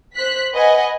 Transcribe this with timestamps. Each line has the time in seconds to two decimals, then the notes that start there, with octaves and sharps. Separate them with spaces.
0.15 C5 F#6 B6
0.53 B4 D#5 F#5 G#5